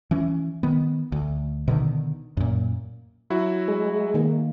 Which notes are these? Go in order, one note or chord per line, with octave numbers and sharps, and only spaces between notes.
E3 C#4
D#3 B3
D2
B2 D3 D#3
F#2 A#2
F#3 E4 F#4
G#3
D#3 A#3